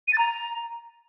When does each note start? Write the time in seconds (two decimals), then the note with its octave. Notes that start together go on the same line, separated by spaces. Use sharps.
0.08 D#7
0.13 A6
0.18 A#5